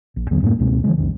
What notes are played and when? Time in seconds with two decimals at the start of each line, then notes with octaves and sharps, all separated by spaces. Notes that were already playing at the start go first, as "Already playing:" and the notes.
0.16 A#1
0.30 D#2 D3 F#3 B3
0.42 F#2 A2 G#3 A#3
0.59 C#2 B2 G#3 C4
0.84 D3 E3 F3 G#3
0.98 B1 F2 D#3